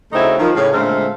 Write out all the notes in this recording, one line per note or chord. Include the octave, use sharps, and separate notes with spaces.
C#3 F#3 A3 C4 D#4 E4
D#3 F3
A2 C#3
A#2 D3 G#3 A3 C4 F5